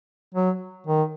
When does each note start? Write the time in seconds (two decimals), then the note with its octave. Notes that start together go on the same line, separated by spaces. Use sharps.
0.34 F#3
0.87 D#3